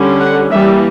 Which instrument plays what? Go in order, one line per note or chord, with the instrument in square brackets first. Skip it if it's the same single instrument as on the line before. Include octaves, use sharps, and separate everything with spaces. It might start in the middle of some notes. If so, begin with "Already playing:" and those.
Already playing: [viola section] D3 G3 C#4
F#5
E3 G3 A#3 E5